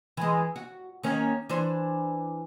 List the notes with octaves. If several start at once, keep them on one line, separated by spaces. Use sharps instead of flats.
E3 G#3
F#4
D#3 A#3 C#4
E3 D4 C5